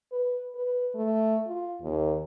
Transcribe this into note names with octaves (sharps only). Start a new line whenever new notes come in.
B4
B4
A3
F4
D#2